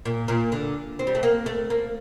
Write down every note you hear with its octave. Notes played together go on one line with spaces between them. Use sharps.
A#2
A#2
D3
C4
G3
A3
A#3
A3
A#3